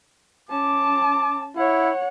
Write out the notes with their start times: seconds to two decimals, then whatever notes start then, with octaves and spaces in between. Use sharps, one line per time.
0.49 C#4 A5 D6
1.57 E4 C#5 F#5